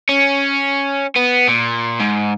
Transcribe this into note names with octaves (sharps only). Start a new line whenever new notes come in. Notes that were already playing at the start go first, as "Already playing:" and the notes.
C#4
B3
A#2
G#2